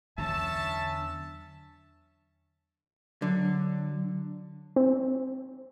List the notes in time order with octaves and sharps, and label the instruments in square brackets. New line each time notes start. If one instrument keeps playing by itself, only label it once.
[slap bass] E2 E3 F#3 [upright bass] D3 [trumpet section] C#4 A5 [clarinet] E5
[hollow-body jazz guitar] D3 [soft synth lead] F#3
[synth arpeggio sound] C4